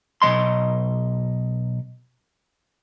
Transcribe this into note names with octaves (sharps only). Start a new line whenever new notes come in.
B1 E3 D#5 C6